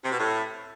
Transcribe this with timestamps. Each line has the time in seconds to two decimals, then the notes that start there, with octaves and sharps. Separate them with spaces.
0.04 C3
0.12 B2
0.19 A2